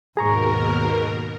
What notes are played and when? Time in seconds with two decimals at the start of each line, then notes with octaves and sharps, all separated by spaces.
0.17 D#2 G#2 B2 G#4 A#4 A#5 C#6